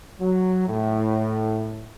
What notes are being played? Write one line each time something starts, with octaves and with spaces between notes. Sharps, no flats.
F#3
A2